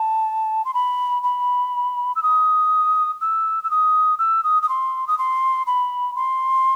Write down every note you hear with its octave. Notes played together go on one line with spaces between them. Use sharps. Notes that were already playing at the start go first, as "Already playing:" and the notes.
Already playing: A5
C6
B5
B5
E6
D#6
E6
E6
D#6
E6
D#6
D#6
C6
D#6
C6
B5
C6